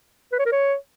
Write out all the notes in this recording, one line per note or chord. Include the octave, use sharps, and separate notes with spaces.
B4
C#5
A#4
C#5